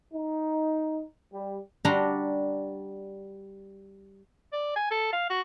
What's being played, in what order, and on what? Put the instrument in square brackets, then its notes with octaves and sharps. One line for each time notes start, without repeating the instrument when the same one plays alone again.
[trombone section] D#4
G3
[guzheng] G3 D4 F#4 A#5 C6
[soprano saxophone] D5
G#5
A4
F5
F#4